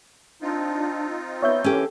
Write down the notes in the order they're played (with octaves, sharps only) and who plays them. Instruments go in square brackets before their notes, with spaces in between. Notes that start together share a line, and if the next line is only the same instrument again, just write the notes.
[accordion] C4 D#4 F4 [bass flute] D4
[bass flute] B3 [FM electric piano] C#5 E5 G6
[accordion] D3 E3 A#3 [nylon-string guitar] C#4 G4 [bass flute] A4